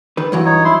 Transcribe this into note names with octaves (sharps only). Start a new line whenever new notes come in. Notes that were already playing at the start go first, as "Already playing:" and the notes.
D#3 B4
G2 E3 F#3
D#4 C#5
E4 C6